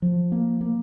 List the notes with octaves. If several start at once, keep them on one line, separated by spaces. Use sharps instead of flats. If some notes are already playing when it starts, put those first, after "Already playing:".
F3
A#3
A#3